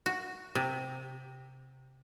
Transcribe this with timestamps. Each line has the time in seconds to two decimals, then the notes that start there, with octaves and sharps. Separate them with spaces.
0.06 F#4
0.55 C3